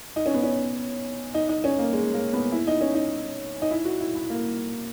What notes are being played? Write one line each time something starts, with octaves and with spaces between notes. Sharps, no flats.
D#4
C#4
B3
C#4
D#4
D#4
C#4
A#3
G#3
A#3
B3
E4
D#4
C#4
D#4
D#4
E4
F#4
E4
E4
A#3